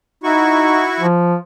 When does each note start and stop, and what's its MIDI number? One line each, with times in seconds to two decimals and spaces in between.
0.24 0.84 63
0.24 1.06 64
0.24 1.06 66
0.24 1.06 85
1.00 1.36 53